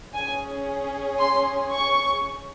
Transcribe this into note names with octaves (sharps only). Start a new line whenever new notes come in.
C#4 G#4 G#5
C6
C#6